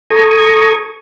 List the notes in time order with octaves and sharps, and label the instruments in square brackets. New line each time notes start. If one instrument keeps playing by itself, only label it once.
[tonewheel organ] A4 A#5 C#6 D#6 G#6